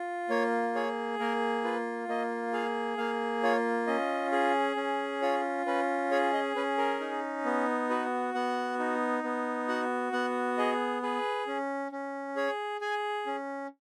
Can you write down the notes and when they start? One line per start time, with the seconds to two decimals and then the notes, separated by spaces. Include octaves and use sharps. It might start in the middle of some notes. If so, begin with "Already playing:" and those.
Already playing: F4
0.29 A#3 C#5
0.75 G#4 C#5
1.19 A#3 A#4
1.64 F4 B4
2.08 A#3 D#5
2.53 G#4 F5
2.98 A#3 F5
3.43 F4 C#5
3.87 C#4 D#5
4.32 G#4
4.76 C#4
5.22 F4 C#5
5.66 C#4 B4
6.11 G#4 C#5
6.33 D#5
6.56 C#4 B4
6.78 A#4
7.00 D#4
7.45 B3
7.90 F#4 B4
8.34 B3 F#5
8.79 D#4
9.24 B3
9.68 F#4 F#5
10.12 B3 F#5
10.58 G#4 D#5
11.02 G#4 B4
11.47 C#4
11.92 C#4
12.36 G#4 C#5
12.81 G#4 G#5
13.26 C#4